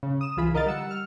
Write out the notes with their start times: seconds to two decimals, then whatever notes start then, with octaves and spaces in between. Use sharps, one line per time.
0.03 C#3
0.21 D#6 E7
0.37 C2 E3 F4 G#4 B5
0.53 D3 A#4 D#5 F5 A6
0.66 G3 F#5 E6 C#7
0.91 F6